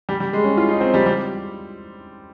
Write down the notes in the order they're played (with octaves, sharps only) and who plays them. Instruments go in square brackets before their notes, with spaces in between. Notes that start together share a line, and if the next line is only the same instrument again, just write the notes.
[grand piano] G3
G3
G#3
C#4
F4
D#4
C4
G3
G3